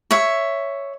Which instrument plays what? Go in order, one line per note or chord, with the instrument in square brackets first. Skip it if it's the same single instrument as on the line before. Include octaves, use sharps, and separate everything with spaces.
[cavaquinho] C#5 E5